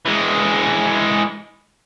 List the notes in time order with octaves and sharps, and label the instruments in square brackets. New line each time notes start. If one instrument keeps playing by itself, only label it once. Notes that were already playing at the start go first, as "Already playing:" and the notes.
[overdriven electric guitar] E3 G#3